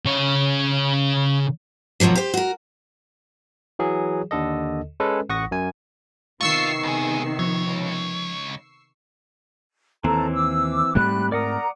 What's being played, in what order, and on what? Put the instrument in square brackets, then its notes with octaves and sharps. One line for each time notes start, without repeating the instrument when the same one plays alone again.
[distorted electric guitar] C#3 C#5
[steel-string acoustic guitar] D#2 B2 F3 F#3 A#3
G4 C5
F#4 A#4
[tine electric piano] E3 F#3 G#4
D#2 D3 A4 D#5
G#3 C#4 A4 B4
A1 F#5 C#6 D#6 A#6
F#2 G#5
[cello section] C3 D#3 B3 [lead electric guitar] F4 [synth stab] C#6 E6 C7
[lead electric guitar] C#2 G#4
[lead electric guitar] C#2 C#5 [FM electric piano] F3
[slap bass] D#2 [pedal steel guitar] E3 C4 E4 [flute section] A4 A#5
[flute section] D6 E6
[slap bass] G#2 A3 C4 [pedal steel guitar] G3 [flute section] B5 F#6
[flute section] A#4 A#5 [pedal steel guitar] D5 F#5 D#6